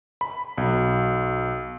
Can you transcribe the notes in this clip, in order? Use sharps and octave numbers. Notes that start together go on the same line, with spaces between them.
B5
B1